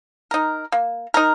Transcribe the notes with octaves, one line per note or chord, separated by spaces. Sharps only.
D#4 A#4
A#3
D#4 A#4